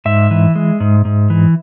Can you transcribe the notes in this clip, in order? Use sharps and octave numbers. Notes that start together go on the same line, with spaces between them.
G#2 E5
E3
G#3
G#2
G#2
E3